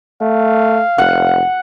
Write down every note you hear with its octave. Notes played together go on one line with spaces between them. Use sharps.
A3 F5
F1 F#5